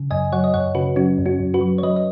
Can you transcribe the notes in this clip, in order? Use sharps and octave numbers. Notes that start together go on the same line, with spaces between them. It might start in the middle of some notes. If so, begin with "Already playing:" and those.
Already playing: C#3
F#2 D#5 G#5
F#3 C#5 F#5
D#5
F#2 C#5 F#5
C#3 F#4 B4
F#3 C#4 F#4
F#2
C#4 F#4
F#2
F#4 B4
F#3
C#5
F#3 B4 D#5
D#5